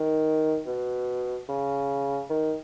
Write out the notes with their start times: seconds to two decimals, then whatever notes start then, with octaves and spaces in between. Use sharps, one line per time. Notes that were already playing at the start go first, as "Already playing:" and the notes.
Already playing: D#3
0.66 B2
1.49 C#3
2.30 D#3